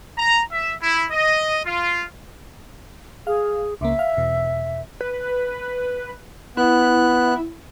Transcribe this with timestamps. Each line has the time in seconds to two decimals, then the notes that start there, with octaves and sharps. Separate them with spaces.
0.17 A#5
0.52 E5
0.81 E4
1.11 D#5
1.66 F4
3.27 G#4 F5
3.81 C#2 C#3 A#3 E5
3.99 F5
4.17 E2 B2
5.01 B4
6.57 B3 E4 F#6